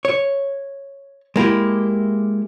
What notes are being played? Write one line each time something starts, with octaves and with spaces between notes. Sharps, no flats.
C#5
G#3 A#3 E4 G4